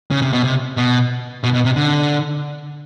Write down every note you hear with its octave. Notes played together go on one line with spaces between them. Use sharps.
C#3
C3
B2
C3
B2
B2
B2
C3
D3